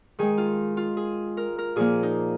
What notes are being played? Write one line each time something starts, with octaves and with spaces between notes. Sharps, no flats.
D#3 G#3 G#4
F4
F4
G#4
A#4
A#4
A#2 F3 A#3 G#4
D#4